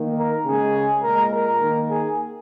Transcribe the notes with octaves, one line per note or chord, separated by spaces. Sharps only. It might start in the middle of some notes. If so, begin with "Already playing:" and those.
Already playing: D#3 A#3
A#4
C#3 G#3 G#4
A#2 G#3 A#4
A#4
D#3 A#3
G#4